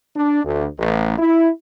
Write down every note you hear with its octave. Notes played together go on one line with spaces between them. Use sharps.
D4
D2
A1
E4